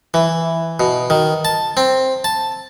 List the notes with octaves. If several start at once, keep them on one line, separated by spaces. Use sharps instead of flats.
E3
B2
D#3
A5
C4
A5